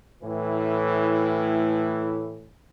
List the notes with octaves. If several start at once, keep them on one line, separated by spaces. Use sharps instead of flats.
A2 E3